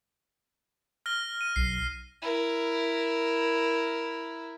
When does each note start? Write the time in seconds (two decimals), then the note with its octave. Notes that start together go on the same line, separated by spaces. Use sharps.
1.06 F6 A#6 G7
1.41 D#7
1.56 B1 C7
2.22 E4 A#4